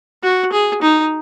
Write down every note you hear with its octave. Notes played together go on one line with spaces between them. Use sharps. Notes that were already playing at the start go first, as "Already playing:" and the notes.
F#4
G#4
D#4